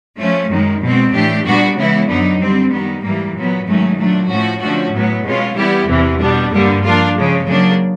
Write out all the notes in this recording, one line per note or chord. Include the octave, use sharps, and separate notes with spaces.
F3 A3 C#4
F#2 D#3 G#3
B2 G#3 C4
A2 E3 A3 D4 G4
A#2 G3 B3 D4 F#4
C#3 E3 G#3 B3 E4
F#2 D3 F#3 B3 D#4
D3 G3 C4
D#3 G3 B3
G#2 E3 G3 A#3
A#2 F#3 B3
G#2 D#3 F#3 A3 C#4
A#2 F#3 A3 D4
A2 F3 A3 C#4 F#4
D3 F3 A3 C#4 F#4
A2 F#3 B3
B2 G#3 C#4 F4
E3 G3 B3 E4 G4
E2 C3 E3
B2 G3 B3 D4
G2 D3 G3 A#3
F3 A#3 D4 F4
C#3 F3 G#3
C#3 F#3 A#3 D4